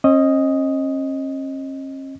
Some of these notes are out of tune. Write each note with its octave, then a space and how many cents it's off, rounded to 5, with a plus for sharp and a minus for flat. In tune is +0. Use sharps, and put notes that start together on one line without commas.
C#4 -45 D#5 +0